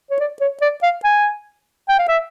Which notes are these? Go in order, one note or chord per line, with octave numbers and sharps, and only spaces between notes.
C#5
D5
C#5
D5
F5
G#5
G5
F5
E5